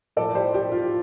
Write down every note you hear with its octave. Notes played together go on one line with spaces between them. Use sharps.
A2 F3 A3 A4 D5
G4 C5
G4
F4